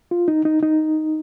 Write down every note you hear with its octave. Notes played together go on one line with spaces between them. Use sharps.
F4
D#4
D#4
D#4